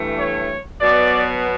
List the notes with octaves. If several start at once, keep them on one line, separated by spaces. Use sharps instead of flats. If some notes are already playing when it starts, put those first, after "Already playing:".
Already playing: G2 E3 A3
C#5
B2 F#3 B3 D5